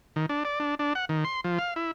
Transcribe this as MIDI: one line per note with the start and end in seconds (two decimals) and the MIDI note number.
0.16 0.26 51
0.29 0.43 62
0.45 0.59 74
0.60 0.75 62
0.79 0.93 62
0.95 1.05 78
1.09 1.24 51
1.24 1.41 84
1.44 1.58 53
1.59 1.74 77
1.76 1.91 64